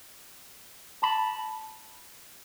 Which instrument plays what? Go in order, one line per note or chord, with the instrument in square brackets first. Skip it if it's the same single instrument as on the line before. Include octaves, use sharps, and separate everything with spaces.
[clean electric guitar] A5 B5